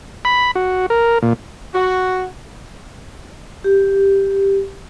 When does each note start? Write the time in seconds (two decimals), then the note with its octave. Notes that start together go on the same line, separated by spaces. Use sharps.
0.25 B5
0.55 F#4
0.90 A#4
1.22 A#2
1.74 F#4
3.64 G4